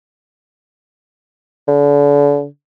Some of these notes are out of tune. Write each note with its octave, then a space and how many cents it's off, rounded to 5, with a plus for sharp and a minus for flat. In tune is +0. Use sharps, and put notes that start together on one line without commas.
D3 -35